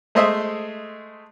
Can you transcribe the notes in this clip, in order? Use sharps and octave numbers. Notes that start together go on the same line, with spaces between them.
G#3 A3 C5 D#5 E5